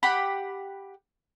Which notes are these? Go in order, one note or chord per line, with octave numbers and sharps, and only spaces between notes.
G4 F#5 B5